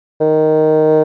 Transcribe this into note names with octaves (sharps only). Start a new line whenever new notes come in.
D#3